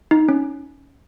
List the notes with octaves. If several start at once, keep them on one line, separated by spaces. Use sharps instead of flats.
D#4
C#4